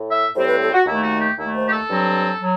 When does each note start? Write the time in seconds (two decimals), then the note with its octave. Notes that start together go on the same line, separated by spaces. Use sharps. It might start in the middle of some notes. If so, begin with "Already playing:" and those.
Already playing: A2
0.09 E5
0.35 A2 G3 C4 C5
0.48 B4
0.61 A4
0.73 F#4
0.86 D#2 D#3 A3 E4
1.03 F#4
1.21 G4
1.38 D#2 D#3 A3 E4
1.55 C5
1.66 G4
1.72 A4
1.89 G2 F#3 C4
2.41 F#3